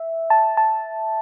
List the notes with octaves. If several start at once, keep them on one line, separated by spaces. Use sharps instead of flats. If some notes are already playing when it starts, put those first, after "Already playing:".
Already playing: E5
A5
A5